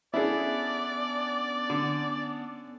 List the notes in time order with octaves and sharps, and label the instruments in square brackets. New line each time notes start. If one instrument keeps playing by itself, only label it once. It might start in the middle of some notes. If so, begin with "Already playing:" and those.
[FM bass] B3 [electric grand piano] C#4 D4 A4 [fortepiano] E4 G#4 [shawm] D5
[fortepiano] D3